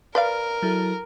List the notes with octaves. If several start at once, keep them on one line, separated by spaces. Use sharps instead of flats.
A#4 B4 D5 F5
F#3 E4 A4